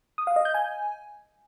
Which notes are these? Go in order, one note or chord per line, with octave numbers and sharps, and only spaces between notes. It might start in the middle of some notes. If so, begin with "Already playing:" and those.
D#6
F5
D#5
G6
G#5